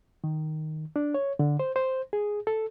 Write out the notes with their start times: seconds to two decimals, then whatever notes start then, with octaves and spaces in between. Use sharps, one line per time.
0.24 D#3
0.96 D4
1.14 C#5
1.39 D3
1.60 C5
1.76 C5
2.13 G#4
2.47 A4